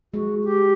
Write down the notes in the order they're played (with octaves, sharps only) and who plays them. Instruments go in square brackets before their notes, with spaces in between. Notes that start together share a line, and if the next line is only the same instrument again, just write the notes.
[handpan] G#3 [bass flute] F#4
[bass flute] G4